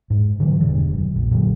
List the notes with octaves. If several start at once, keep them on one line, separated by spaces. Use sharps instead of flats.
G#2
D3 E3 F#3 G3
E1 G2 B2 D3
F#2
A#1
A#2 D3 F#3